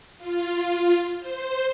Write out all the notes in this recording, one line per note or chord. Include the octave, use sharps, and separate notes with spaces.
F4
C5